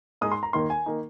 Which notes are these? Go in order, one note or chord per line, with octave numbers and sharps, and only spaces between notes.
G#2 G#3 D#4 D#6
C6
A#5
D#2 D#3 A#3 D#4 C6
G#5
D#3 A#3 D#4